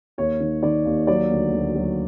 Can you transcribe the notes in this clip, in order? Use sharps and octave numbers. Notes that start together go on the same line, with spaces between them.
D#2 C#5
D#3
D#3 D5
D#2
F#3 D5
D2
D2
F#3